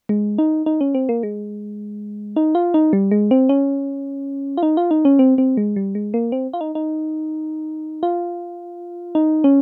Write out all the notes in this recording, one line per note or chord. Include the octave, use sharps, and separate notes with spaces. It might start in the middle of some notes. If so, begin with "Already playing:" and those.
G#3
D#4
D#4
C#4
C4
A#3
G#3
D#4
F4
D#4
G3
G#3
C4
C#4
F4
D#4
F4
D#4
C#4
C4
C4
G#3
G3
G#3
A#3
C4
F4
D#4
D#4
F4
D#4
C#4